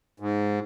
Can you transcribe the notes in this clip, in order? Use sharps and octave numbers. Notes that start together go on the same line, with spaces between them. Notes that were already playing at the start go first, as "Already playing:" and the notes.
G#2